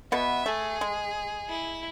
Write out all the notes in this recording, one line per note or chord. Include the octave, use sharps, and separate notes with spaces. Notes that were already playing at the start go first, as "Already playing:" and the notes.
B2 B3 E5
A3 G#4
G#3
E4